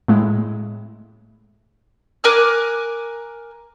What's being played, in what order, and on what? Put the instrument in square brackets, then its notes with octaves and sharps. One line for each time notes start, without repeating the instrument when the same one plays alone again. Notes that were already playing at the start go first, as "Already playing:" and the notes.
[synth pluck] A2 G#3 E4
[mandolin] A#4 G#5 D6 F#6